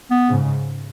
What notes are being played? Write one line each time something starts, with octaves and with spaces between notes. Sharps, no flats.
B3
G#2 C#3